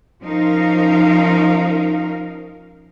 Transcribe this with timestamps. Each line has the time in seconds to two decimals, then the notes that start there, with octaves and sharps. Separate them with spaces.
0.22 F3 C#4 D#4 A#4 F5